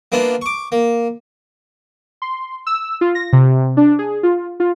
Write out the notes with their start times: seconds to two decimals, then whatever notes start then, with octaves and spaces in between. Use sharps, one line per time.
0.12 A#3 B3 D4 E4 F4
0.41 C#6 D6
0.72 A#3
2.22 C6
2.67 E6
3.01 F4
3.15 A#6
3.33 C3
3.77 D4
3.99 G#4
4.23 F4
4.60 F4